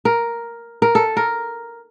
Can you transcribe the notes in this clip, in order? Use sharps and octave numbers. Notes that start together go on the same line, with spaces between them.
A#4
A#4
A4
A#4